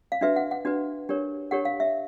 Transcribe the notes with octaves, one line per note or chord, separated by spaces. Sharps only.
F5
D4 F#4 B4 E5
F#5
F#5
D4 F#4 B4
D4 G4 A#4 C#5
D4 G4 A#4 C#5 F#5
F5
E5